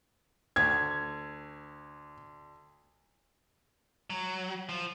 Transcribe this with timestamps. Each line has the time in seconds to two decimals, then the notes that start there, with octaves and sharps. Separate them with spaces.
0.56 D2 G#6
4.10 F#3
4.69 F3